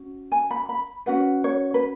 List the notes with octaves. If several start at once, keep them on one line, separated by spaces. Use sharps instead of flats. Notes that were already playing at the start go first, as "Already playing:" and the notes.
Already playing: C#4 F#4
G#5
B5
B5
C#4 F#4 B4 F#5
C#5
B4